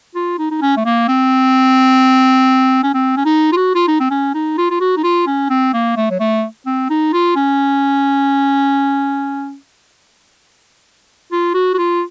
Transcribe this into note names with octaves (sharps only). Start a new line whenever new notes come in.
F4
D#4
D#4
C#4
A3
A#3
C4
C#4
C4
C#4
D#4
F4
F#4
F4
D#4
C4
C#4
D#4
F4
F4
F#4
D#4
F4
C#4
C4
A#3
A3
F#3
A3
C4
D#4
F4
C#4
F4
F#4
F#4
F4